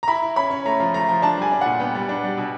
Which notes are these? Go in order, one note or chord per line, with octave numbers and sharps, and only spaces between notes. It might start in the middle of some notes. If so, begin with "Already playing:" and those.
A#5
E4 B5
E4
C#4 B5
C#4
A3 A#5
F3
A3 A#5
F3
D4 A5
G3 G#5
D4
F#5
A#2
B3 G5
G3
D4
G3
B2